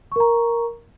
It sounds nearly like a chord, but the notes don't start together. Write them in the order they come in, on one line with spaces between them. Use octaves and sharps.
C#6 A#4 A#5